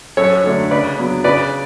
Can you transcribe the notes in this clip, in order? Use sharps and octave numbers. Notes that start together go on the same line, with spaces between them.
F#2 A4 C#5
D3 F#3 A3 D4
C#3 B4 D5
F#3 B3 D4
C#3 B4 D5